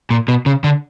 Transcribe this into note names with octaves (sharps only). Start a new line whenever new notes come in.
A#2
B2
C#3
D3